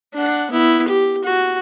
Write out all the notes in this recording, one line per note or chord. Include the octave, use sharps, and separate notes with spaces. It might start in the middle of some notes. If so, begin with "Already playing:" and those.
D4 F#5
B3 E4
G4
F#4